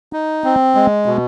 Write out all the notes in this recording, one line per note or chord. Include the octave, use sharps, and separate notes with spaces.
D#4
C4
G#3
B2